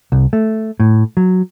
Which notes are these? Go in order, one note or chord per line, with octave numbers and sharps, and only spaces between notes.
C2
A3
A2
F#3